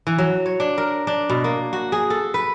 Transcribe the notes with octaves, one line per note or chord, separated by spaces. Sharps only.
E3
F#3
C#5
D4
A#4
D4
B2
A#3
F#4
G#4
A4
B4